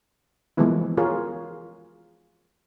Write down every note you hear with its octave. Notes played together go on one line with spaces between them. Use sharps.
E3 F3 G#3 A#3 B3 E4
F4 F#4 G#4 A#4 C#5